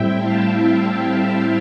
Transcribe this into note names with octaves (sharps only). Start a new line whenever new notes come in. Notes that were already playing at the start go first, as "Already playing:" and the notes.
Already playing: A2 G3 C4 E4 E5 G5
F5 A5
F5 A5